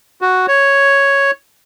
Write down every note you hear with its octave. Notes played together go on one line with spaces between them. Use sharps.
F#4
C#5